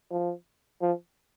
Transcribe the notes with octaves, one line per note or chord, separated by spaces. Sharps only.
F3
F3